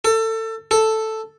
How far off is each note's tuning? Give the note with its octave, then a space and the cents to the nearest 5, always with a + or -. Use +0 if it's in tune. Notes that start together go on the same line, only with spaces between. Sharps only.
A4 +25
A4 +0